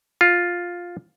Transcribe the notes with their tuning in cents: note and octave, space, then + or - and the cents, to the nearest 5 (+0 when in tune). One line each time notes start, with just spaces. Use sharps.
F4 +5